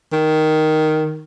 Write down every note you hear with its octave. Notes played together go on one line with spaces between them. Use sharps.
D#3